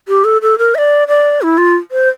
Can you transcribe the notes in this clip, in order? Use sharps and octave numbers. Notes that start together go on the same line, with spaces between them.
G4
A4
A4
A#4
E5
D5
D5
E4
F4
C5